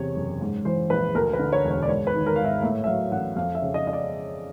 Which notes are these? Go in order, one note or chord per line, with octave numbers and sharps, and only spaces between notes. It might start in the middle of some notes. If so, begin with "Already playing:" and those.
Already playing: E2 C3 C#5
F#1
G#2
E3 C5
A#1 B4
D2 A#4
B4
D3
C#5
E1
C#5
D5
G#2 C#5
B4
D#3
A#4
G#1 F5
E5
A2 E5
E5
F#3 F5
A1 F#5
F2 F5
E5
C#3
D#5
D#5
D5